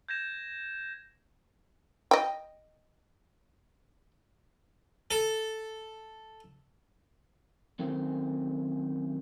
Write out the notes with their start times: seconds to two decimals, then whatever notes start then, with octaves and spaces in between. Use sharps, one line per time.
0.08 G6 G#6 A#6 E7
2.11 D#5 G5
5.11 A4
7.79 F#2 C3 D#3 A3 C4